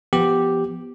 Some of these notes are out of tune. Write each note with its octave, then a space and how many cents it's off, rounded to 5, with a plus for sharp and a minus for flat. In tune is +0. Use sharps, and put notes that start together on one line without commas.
F3 -20 B3 +0 G4 +0